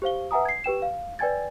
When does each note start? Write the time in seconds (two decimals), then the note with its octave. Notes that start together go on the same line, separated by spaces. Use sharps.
0.02 G4 C5 F5 G7
0.31 B4 E5 F#5 G#5 A#5 D#6
0.45 G#6 C7
0.64 G4 B4 G5 E7
0.82 F5
1.19 B4 D5 G5 G#5 G#6 A6